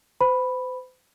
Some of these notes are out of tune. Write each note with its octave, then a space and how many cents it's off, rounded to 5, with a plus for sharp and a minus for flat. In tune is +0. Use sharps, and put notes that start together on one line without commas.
C5 -40 B5 +0